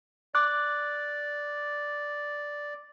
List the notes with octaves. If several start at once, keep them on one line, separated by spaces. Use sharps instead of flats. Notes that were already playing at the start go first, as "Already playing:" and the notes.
D5 D6 F#6